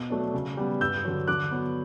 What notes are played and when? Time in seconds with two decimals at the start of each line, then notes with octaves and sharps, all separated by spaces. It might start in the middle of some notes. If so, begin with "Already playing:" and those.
Already playing: B2
0.10 F#3 A3 D4
0.34 C#3
0.57 G3 B3
0.80 G2 E6 G6
1.05 D3 F#3
1.27 D3 D6 F#6
1.51 F#3 B3